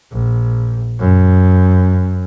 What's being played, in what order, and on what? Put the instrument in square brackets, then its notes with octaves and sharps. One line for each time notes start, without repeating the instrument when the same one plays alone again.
[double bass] A#1
F#2